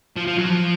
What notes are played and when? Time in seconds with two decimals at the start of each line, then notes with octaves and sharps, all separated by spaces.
0.17 F3
0.27 F3
0.38 F#3
0.50 F3